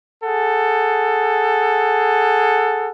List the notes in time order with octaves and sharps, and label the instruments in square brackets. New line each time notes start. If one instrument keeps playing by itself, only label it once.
[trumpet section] G#4 A4 F#5